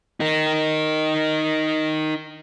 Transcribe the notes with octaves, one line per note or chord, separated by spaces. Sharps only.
D#4 A#4